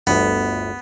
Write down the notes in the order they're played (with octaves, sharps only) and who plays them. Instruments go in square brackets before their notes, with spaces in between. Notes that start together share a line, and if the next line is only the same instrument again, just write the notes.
[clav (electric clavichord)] G1 D2 [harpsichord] B3